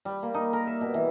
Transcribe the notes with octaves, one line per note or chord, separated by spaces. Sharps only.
G3
A#3
D#4
A#4
E5
B2
E3